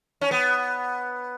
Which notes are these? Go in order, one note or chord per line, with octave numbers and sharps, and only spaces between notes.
C#4
B3